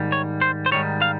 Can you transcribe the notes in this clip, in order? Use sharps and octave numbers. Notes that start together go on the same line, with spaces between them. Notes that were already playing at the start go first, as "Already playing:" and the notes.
Already playing: G#2 D#3 G3
C#5
C5
C5
G#2 D#3 G3 C#5
F5